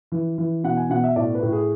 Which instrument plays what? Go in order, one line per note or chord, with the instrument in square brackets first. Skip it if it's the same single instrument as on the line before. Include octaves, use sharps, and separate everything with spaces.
[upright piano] E3
E3
B2 F#5
G#5
B2 F#5
E5
A2 D5
B4
A2
G#4